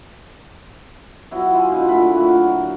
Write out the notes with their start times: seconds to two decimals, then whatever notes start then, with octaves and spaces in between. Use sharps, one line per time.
1.31 F#3 B3 E4 F#4
1.54 E4 F4 G#5
1.71 B2 D3
1.89 A#2 A3 B5
2.17 F#4 A#4
2.33 F#3